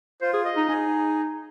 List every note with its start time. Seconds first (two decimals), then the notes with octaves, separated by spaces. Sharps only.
0.21 F4 C5
0.33 G#4
0.45 D#5
0.57 D#4
0.68 D#4 G#4